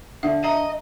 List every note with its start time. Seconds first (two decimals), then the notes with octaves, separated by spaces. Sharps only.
0.23 D3 E5
0.44 D#5 E5 A#5